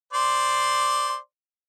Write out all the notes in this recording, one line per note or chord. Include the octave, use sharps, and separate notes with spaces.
C5 D5 C6